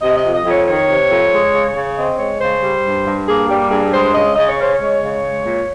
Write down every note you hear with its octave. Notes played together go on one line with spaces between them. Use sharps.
C3 D#5
F2 D#5
D#5
F2
C#5
D#3 C#5
C3
F2
G#3
C#3
C#3
C4 D#5
G#3 C#5
C#3 C5
G3
G2
G2
A#3 G#4
G3 G4
G2 G#4
G#3 C5
C#3 D#5
C#3 D#5
C#5
C#4 C5
G#3 C#5
C#3
G#3
A#2